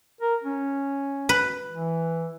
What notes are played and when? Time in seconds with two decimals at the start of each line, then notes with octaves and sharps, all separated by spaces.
0.21 A#4
0.43 C#4
1.29 B4
1.72 E3